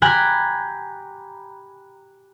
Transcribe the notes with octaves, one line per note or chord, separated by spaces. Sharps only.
G4 G5 G#5 A#5 B5 F#6